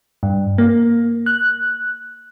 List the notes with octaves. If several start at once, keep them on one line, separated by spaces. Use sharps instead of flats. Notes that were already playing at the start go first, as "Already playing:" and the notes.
G2
A#3
F#6